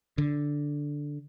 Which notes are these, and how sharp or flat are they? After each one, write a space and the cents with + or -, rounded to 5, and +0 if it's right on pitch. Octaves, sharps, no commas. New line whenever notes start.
D3 -5